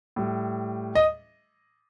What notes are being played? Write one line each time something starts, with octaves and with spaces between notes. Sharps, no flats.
A2 G3
D#5